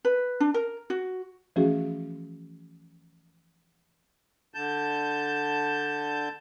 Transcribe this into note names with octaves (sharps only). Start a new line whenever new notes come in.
B4
D4
A#4
F#4
E3 F3 A3 C#4 F#4 G#4
D3 A5 G6